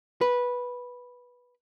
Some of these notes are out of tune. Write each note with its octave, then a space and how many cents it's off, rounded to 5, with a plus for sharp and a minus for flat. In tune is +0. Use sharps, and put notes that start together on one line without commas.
B4 -10